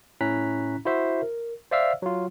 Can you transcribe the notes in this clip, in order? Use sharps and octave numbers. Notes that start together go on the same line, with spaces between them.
A2 C#4 E4 A#5 F#6 B6
E4 F#4 C5 E5
A#4
C5 D5 E5 F5 E6 F6
F#3 F4